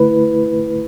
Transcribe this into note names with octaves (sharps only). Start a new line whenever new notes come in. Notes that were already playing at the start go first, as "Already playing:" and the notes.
Already playing: D3 A3 E4 B4